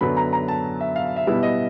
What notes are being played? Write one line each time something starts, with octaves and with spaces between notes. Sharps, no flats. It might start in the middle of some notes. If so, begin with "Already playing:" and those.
F#2 D3 F#3 B3 B5
A#5
A#5
A5
E5
F5
E5
B2 G3 B3 E4 E5
D#5